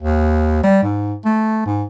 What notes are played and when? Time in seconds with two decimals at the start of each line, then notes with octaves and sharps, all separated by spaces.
0.01 D#2
0.63 G3
0.83 G#2
1.25 A3
1.66 G#2